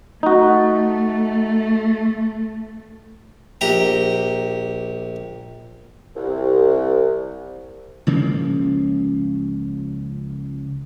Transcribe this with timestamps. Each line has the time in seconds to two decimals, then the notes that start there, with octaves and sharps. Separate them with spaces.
0.23 A3 D#4 F#4
3.61 A#1 G4 A#5
6.16 C2
8.07 C#2 C#3 F3 A#3